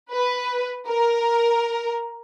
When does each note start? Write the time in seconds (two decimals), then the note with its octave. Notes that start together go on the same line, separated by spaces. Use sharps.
0.12 B4
0.88 A#4